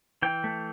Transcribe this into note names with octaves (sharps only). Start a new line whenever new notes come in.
E3 G5
A3